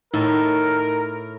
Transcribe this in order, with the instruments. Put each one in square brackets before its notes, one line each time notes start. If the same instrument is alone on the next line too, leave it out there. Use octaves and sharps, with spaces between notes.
[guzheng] A2 [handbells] D#4 [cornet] A#4